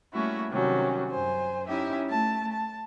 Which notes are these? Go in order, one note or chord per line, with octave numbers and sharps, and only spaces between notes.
G3 A3 A#3 C#4 E4 F#4
C3 D#3 F#3 G3 C#4
F#2 C5 G#5
C#4 D#4 E4 G4 E5
A3 A5
A5